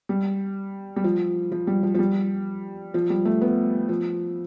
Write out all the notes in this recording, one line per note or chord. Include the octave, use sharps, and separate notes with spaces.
G3
G3
F3
F3
G3
F3
F3
G3
F3
G3
A3
B3
F3